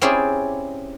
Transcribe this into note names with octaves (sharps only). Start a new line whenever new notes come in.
C4 C#4 E4 G4 G#4 D5